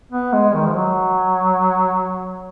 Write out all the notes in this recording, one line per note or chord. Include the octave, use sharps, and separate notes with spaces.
B3
G#3
D#3
F3
F#3